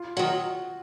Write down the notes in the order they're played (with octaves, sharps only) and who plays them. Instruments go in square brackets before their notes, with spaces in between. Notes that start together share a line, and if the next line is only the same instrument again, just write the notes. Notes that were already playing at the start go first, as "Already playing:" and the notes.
Already playing: [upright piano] F4
[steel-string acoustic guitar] D#3 F#3 [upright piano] F#4